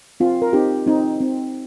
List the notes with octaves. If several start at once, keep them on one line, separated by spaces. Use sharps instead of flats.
C4 F4
A#4
C4 D#4 G4
C4 D#4
C4